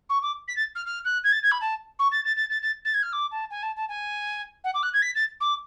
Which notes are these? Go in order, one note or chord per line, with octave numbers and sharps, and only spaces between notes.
C#6
D6
B6
A6
F6
F6
F#6
G#6
A6
G#6
B5
A5
C#6
A6
A6
A6
A6
A6
A6
G#6
F6
D6
A5
G#5
A5
A5
G#5
F#5
D6
F#6
G#6
B6
A6
D6